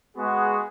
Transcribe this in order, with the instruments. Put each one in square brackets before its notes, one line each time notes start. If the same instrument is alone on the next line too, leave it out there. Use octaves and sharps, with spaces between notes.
[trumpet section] G#3 B3 F#4 G#4